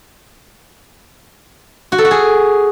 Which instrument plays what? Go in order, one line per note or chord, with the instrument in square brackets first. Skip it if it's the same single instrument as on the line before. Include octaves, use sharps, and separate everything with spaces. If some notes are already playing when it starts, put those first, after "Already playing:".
[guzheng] F#4
A4
F#4
G#4